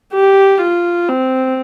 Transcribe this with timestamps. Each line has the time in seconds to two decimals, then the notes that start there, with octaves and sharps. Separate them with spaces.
0.14 G4
0.61 F4
1.09 C4